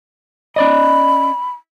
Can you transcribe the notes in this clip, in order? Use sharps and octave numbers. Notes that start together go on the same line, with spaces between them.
C#4 D5 D#5 B5